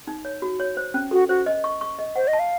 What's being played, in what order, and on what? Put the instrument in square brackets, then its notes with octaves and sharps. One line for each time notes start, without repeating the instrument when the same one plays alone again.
[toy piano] D#4
C#5
F#4
C#5
C5
C#4
[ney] F#4 [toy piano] A4
[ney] F#4 [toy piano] C5
[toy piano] D#5
C#6
C#6
D#5
[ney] C5 [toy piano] F#5
[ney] D#5
[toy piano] A5
[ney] F5